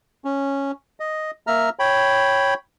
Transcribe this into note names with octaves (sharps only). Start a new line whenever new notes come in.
C#4
D#5
A#3 E5 A#5 F6
C#5 G5 B5